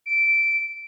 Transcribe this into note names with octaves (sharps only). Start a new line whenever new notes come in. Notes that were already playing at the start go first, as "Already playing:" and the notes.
D7